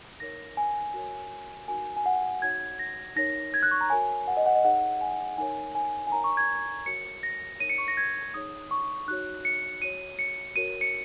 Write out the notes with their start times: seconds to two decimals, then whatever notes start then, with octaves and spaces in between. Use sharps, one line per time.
0.20 D#4 A#4 C#5 A#6
0.57 G#5
0.94 F#4 A#4 C#5
1.68 D#4 F#4 A#4 G#5
1.97 G#5
2.06 F#5
2.42 D#4 F#4 C#5 G#6
2.79 A#6
3.16 D#4 A#4 C#5 A#6
3.54 G#6
3.63 F#6
3.71 C#6
3.81 A#5
3.90 F#4 A#4 C#5 G#5
4.27 F#5
4.37 D#5
4.46 F#5
4.55 D#5
4.64 D#4 G#4 C#5 F#5
5.01 G#5
5.38 D#4 A#4 C#5 G#5
5.75 G#5
6.07 G#5
6.12 D#4 A#4 C#5 A#5
6.24 C#6
6.37 G#6
6.86 F#4 A#4 C#5 C#7
7.23 A#6
7.60 D#4 A#4 C#5 D#7
7.70 C#7
7.78 C#6
7.88 A#6
7.97 G#6
8.34 D#4 G#4 C#5 D#6
8.71 C#6
9.08 D#4 F#4 C#5 F#6
9.45 C#7
9.82 F#4 C#5 D#7
10.19 C#7
10.56 F#4 A#4 C#5 D#7
10.81 C#7